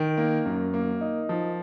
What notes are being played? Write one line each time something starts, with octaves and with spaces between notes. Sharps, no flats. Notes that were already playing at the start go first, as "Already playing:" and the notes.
Already playing: D#3
A#3
F#2
A#3
D#4
F3